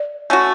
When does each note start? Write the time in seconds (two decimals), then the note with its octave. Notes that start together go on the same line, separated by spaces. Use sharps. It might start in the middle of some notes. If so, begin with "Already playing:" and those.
Already playing: D5
0.30 A3 C#4 F#4